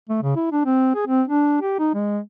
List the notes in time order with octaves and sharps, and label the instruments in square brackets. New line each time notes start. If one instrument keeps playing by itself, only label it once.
[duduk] A3
C#3
E4
D4
C4
G#4
C4
D4
G4
D#4
G#3